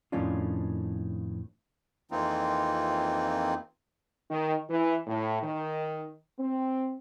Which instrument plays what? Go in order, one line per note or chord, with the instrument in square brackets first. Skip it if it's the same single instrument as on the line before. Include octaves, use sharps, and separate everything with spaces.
[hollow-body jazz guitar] F2 A2 D#3 C#4 D4 F4
[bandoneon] F2 E3 A#3 C4 D#4 F4
[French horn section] D#3
E3
A2
D#3
C4